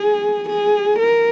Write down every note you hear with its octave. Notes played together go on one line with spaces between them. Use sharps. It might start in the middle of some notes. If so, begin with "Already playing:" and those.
Already playing: G#4
G#4
A#4